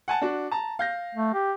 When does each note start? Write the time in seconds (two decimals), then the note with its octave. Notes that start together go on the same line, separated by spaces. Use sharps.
0.08 F#5 G#5 A5
0.21 D4 F#4
0.51 A5 A#5
0.79 F5 G6 A#6
1.15 A3
1.34 G4